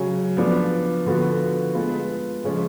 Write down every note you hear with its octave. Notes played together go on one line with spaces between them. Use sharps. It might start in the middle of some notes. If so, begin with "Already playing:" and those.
Already playing: C#3 F#3 C#4
F3 B3 D4
D3 F3 B3 F#4
G#3 B3 F4
C#3 F3 G#3 C#4 F4